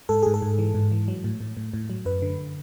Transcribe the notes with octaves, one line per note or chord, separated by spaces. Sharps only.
G#2 A4
G#2 G#4
A4
G#2
E3
G#2
E3
F#3
A2
A2
A2
A2
F#3
F#2 B4
D3